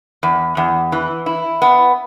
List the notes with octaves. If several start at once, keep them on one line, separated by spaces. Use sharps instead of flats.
E2
E2
E3
E4
B3